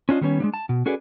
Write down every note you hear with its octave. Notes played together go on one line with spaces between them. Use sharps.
C#4 D4 F4 D#5
D#3 G3 B3 C#4 C#5
G#3 A#3 D4
A5
B2
C#4 F#4 G#4 A4 B4 D5